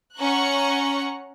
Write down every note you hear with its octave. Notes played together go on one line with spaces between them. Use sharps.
C#4 F#5 A#5 C#6 F#6